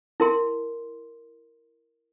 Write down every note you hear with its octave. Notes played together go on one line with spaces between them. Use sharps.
E4 A#4 C6